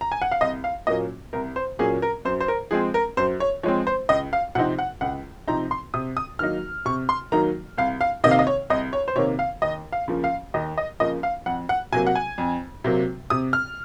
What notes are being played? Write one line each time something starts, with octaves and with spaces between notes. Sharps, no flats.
A#5
G#5
F#5
F5
C2 D#5
F5
A#2 F#3 A#3 C#4 D#5
C2 A#4
C5
A#2 F#3 A#3 C#4 G#4
A#4
F#2 C5
C5
A#4
F3 G#3 C4 G#4
A#4
F#2 C5
C#5
F3 G#3 C4 C#5
C5
C#2 D#5
F5
C3 F3 C4 D#4 F#5
F#5
C#2 F#5
C3 F3 C4 D#4 A#5
C6
C3 D#6
D#6
D#3 F#3 A#3 D#4 F6
C3 C#6
C6
D#3 F#3 A#3 D#4 A#5
C2 F5
F5
C3 D#3 A#3 D#5
F5
D#5
C#5
C2 D#5
C#5
C5
C3 D#3 A#3 C#5
F5
D#2 D#5
F5
C#3 F3 A#3
F5
D#2 D#5
D#5
C#3 F3 A#3 D#5
F5
F2 F#5
F#5
C3 F#3 A#3 G#5
F#5
G#5
F2
C3 F#3 A#3
C3 D#6
F6